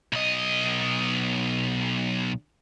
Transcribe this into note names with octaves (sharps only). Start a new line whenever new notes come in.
B1 D#5